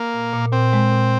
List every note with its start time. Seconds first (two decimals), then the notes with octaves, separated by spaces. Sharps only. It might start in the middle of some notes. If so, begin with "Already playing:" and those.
Already playing: A#3
0.14 A#2
0.34 A#2
0.52 A#2 C4
0.73 G#3
0.92 A#2